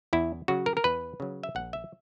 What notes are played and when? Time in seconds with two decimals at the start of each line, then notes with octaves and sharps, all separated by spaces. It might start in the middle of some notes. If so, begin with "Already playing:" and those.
0.13 E2 E4
0.48 C#3 F#3 F#4
0.66 A#4
0.77 A#4
0.84 E2 B4
1.20 C#3 F#3
1.43 E5
1.55 A#1 F#5
1.73 E5